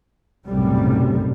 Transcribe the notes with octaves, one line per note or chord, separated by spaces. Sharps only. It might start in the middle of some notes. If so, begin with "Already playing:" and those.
B1 F#2 A2 C3 G3